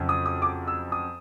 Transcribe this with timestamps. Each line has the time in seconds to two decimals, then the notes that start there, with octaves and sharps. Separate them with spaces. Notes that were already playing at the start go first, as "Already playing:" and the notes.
Already playing: F2 C#3 F#3
0.09 D#6
0.26 D#6
0.42 D6
0.68 E6
0.92 D#6